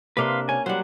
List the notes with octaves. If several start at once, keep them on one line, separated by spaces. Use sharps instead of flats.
C3 A#3 D4 B4 F5 C6
C#4 G#5
F#3 G3 C5 F#5